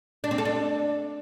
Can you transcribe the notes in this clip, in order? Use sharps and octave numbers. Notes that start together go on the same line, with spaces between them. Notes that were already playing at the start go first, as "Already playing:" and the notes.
D4
C4
A4
D4